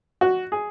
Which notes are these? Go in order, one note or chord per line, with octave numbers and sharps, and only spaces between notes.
F#4
G#4